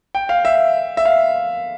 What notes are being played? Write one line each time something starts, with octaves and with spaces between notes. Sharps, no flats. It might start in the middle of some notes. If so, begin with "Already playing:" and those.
G5
F5
E5
E5
F5